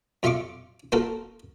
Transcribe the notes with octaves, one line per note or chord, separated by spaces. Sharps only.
F2 F4 E5 F5 C#6 D6
A#3 F4 F#4 A4 A#4